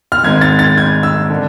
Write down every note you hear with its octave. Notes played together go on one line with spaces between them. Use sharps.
F6
G#1 G#2 G#3 G#6
A6
A6
G#6
E6
D3